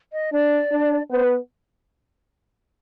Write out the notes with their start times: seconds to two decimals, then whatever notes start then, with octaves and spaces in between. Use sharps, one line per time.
0.13 D#5
0.33 D4 D5
0.71 D4
1.10 B3 C5
1.24 B4